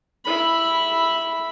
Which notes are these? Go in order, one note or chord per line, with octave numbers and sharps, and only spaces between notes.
E4 B5